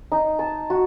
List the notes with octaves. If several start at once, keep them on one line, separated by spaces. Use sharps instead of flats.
D#4
A5
F#4